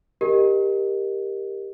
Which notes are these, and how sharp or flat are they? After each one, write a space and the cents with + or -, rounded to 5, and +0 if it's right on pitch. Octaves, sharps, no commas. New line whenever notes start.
G4 +10 A#4 +0 D#5 -15